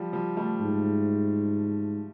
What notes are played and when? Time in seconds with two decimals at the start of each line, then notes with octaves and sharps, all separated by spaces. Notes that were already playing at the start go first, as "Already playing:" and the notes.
Already playing: F3 G3
0.13 F3 G3
0.36 G3 A3
0.60 G#2